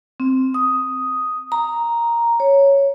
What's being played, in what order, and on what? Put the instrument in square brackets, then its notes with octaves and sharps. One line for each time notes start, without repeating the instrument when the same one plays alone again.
[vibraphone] C4
D#6
A#5
C#5